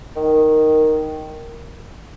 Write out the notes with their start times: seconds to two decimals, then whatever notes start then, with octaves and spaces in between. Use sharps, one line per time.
0.16 D#3